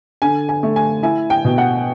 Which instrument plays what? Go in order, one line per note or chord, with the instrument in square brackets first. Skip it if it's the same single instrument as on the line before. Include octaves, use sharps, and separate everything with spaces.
[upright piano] D3 G#5
G#5
A3
G#5
E4 G#5
G5
B2
F#5